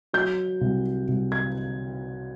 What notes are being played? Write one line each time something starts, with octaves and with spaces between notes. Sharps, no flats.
F#3 G6
C2
C2
G#6